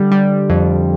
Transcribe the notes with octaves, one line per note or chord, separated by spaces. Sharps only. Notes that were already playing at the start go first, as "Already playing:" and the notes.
Already playing: D3 G3
G3
F2